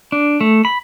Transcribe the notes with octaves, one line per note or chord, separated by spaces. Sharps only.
D4
A3
B5